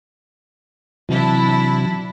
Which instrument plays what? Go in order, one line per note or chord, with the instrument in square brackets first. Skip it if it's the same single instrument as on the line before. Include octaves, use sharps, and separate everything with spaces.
[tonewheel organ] C3 E3 F#3 [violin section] D4 E4